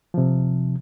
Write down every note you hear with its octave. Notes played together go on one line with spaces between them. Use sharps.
C3 F3